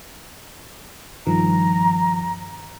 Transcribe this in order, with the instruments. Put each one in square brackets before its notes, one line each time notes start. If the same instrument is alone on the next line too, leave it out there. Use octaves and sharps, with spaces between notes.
[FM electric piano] G2 D#3 F3 [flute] A#5